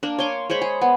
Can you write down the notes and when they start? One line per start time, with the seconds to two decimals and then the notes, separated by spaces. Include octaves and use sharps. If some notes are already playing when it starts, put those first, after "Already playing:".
0.03 A#3 D4
0.19 C#5 G#5 C6 D6
0.50 G#3 C5 C#5 B5
0.62 G#4
0.81 B3